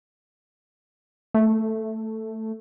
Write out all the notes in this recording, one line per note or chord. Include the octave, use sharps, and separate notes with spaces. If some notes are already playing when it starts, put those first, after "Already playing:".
A3